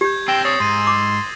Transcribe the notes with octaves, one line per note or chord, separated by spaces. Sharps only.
G4 G6 G#6
C4 D4 G5 E6 A#6 E7
C#5 D#6 A6 C7
G#2 C6 C7 D#7
D6